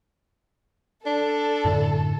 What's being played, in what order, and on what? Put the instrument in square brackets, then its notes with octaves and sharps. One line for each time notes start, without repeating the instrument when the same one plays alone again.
[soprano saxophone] D4 [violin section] A4
[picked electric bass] F#2 A2 D3